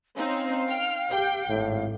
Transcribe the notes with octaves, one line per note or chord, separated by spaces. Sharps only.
C4 C#4 D#4 F5
G5 F6
G4 G5
G#1 A2